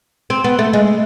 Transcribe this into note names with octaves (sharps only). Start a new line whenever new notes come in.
C4
B3
A3
G#3